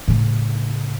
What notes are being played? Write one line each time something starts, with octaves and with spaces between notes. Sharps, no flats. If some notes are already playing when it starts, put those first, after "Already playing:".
A2 C#3